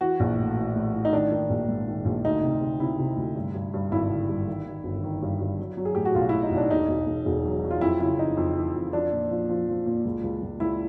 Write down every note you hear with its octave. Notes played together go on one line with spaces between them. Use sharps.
E3 F#4
A#1
A2
E3
A2
E3
D#4
D#3 D4
D#3
A#1
G#2
D#3
A#1
D2 D#4
C3
C3
C3 E4
C3
D2
G2
G2
G2
G#1 E4
D3
G2
D#3
D#3
G1
D#3
G2
G2
F#3
F#3
G#4
A2 G4
F#4
B1 F4
A2 E4
D#4
B1
D4
E1 D#4
E1
E1
E1
F#3
F#3
F4
F2 E4
C#3 E4
F2 D#4
F2
E3
F2
F3 D4
A#2
F3
F3
F3
A#2
C#2
C#2
C#2
C#2 E4